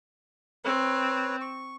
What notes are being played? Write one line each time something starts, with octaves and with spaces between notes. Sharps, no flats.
C4 B4 C#5
C#6